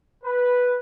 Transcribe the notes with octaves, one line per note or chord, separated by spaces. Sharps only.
B4